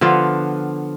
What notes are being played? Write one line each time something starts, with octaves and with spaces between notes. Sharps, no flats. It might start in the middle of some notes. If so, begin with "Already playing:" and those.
D3 F3 B3 F4